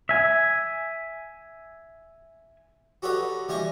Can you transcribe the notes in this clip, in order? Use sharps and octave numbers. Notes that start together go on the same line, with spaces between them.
E5 G#5
F#4 G4 A4 B4 C#5 D#5
E3 G3 G4 D#5 G#5 C#6